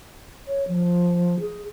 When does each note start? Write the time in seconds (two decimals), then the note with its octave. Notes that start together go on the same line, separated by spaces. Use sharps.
0.48 C#5
0.68 F3
1.40 G#4